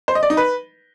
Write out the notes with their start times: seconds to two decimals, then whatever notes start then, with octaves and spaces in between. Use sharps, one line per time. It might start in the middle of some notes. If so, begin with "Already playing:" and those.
0.08 C5
0.15 D#5
0.23 D5
0.30 D#4
0.37 B4